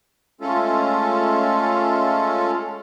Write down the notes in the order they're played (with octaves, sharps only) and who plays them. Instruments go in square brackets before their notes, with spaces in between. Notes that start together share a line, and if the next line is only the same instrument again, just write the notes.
[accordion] G#3 A3 C#4 F4 A4